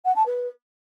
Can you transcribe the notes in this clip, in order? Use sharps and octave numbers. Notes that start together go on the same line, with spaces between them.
F#5
A5
B4